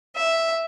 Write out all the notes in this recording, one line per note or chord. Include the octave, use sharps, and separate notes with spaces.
E5